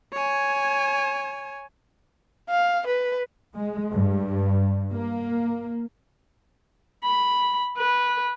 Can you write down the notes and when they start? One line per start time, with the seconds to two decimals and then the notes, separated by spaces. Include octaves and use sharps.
0.13 C#5 G#5
2.49 F5
2.87 B4
3.55 G#3
3.93 G2
4.93 A#3
7.04 B5
7.78 B4